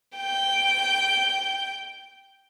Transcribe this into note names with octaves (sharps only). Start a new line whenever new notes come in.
G5 G6